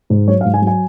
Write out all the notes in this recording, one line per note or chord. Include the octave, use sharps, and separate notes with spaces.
G#2
F#3 C#5
F5
G#2
G#5
F#3
G#5